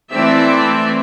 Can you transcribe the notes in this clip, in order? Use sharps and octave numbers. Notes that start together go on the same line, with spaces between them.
E3 A3 C4 D5 E5